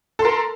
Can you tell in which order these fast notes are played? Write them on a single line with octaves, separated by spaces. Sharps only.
A4 C6 A#4